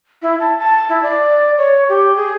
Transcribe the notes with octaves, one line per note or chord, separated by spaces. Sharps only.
E4
A5
A5
E4
D5
C#5
G4
G#4